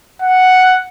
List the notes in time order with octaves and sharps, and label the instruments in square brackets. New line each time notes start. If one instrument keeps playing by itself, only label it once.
[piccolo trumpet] F#5